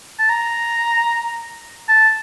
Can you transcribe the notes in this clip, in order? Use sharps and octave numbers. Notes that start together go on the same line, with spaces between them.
A5
A#5
A5